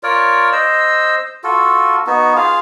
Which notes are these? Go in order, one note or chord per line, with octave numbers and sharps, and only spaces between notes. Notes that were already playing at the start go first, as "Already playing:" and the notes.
F4 A#4 C#5 D5
C5 D#5 E6
F4 F#4 A4
B3 D#4 F#4
F4 G#4 F5